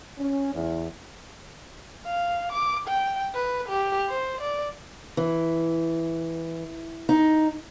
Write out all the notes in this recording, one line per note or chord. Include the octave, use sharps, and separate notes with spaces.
C#4
E2
F5
D6
G5
B4
G4
C5
D5
E3
D#4